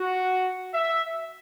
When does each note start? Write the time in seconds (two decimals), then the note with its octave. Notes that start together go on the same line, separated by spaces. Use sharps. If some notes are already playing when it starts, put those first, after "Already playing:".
Already playing: F#4
0.74 E5